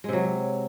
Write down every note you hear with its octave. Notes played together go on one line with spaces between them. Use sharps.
C3 F#3 G#3